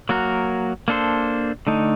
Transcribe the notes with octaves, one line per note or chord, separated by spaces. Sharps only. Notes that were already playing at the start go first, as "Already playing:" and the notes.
F#3 A#3 F#4 A#4
A#3 D4 A4 C5
D3 A3 D#4